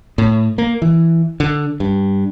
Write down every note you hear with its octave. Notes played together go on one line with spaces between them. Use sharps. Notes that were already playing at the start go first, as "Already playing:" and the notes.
A2
A#3
E3
D3
G2